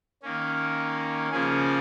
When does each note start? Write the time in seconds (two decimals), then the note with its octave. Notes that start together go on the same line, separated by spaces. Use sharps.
0.22 D#3 A#3 C#4
1.31 C#3 F3 A#3 C#4 G#4